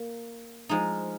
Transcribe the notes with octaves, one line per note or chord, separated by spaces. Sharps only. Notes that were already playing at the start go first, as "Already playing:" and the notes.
Already playing: A#3
F3 G#3 D#4